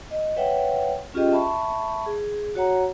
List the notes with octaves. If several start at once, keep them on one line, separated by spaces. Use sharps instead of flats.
D#5
B4 C#5 E5 F#5 G5
C#4 F4 G4 G#4 D#5 G5
E5 A5 B5 C#6
G#4
F#4 C#5 F#5 A#5